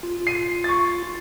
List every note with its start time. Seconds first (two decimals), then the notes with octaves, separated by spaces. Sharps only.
0.03 F4
0.27 C7 D#7
0.64 C#6 A6